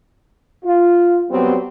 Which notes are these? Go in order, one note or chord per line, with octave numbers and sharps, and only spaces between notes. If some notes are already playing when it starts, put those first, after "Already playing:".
F4
F#3 G3 B3 C4 G4